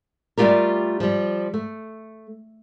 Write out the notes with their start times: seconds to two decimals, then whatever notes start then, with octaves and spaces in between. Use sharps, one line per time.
0.37 G3 A3 C#4 F4 G4 A#4
1.00 F3 G3
1.54 A3